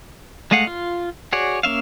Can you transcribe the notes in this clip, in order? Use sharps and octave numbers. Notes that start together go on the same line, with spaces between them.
G#3 A3 D#5 F5 F#5
F4
F#4 G#4 C#5 D5
A#3 C#4 E5 F5